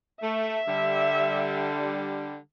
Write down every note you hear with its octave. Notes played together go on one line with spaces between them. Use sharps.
A3 E5
D3 G3